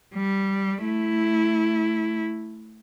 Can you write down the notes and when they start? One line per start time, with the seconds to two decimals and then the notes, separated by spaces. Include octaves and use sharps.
0.15 G3
0.83 A3 E4